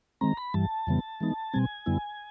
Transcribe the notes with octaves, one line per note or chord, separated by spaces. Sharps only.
D#3 G#3 C4 A#5
B5
G2 E3 G3 A5
F2 C#3 E3 G3 B3
E3 G#3 B3 D#4
B2 G3 C4 G#5
F#2 D3 G3 B3 E4